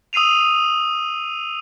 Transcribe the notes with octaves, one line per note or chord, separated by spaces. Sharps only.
D#6 E6 C7 D#7 F7